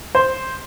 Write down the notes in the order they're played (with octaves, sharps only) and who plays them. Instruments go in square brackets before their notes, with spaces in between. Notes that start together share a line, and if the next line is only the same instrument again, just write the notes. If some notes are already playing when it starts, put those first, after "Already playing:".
[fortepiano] C5